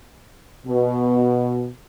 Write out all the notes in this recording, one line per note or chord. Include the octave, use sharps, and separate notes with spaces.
B2